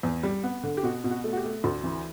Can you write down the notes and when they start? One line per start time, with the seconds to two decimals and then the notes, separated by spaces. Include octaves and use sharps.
0.03 E2
0.23 G3
0.43 B3
0.63 D3
0.77 G4
0.83 B2 F#4
1.04 B2
1.11 F#4
1.24 A3
1.33 F#4
1.37 G4
1.44 A3
1.63 D2 A4
1.84 E3